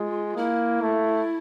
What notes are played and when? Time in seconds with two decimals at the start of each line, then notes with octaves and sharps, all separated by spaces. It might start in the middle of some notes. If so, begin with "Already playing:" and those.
Already playing: G#3 F4
0.36 A#3 E4
0.82 A3